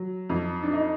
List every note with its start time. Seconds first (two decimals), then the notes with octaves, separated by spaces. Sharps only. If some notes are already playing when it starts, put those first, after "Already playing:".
Already playing: F#3
0.29 F2
0.63 D4
0.73 D#4